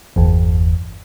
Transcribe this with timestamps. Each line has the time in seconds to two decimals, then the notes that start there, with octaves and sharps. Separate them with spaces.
0.16 G1 E2